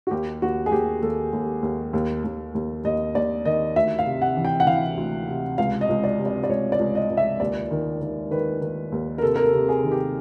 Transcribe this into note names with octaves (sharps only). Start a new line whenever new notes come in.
F#4
D#2 G4
D#2 F#4
G#4
D#2 G4
D#2 A4
D#2
D#2
D#2
D#2
D#2
D#2 D#5
D#2 D5
D#3 D#5
D2 E5
F5
C3
F#5
E3
G5
F#5
E3 F5
D2
C3
C#2 F5
D#5
C#2
D5
C3
D5
D5
C#2 C#5
D5
C#2
D#5
C#2
E5
D#2 D5
D#3
D#3
D#3 B4
D#3
D#2
A#4
C3 A4
A#4
A4
C3
G#4
D#3
G4